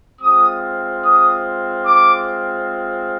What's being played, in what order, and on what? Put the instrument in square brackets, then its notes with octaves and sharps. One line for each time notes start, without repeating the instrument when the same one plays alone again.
[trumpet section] G#3 C4 F4 D#6
D#6
D6